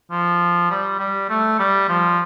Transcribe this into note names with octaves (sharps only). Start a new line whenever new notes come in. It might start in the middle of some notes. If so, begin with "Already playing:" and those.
F3
G3
G3
A3
G3
F3